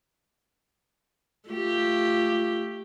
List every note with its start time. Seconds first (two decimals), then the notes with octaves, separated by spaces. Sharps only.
1.49 A3 F4 G4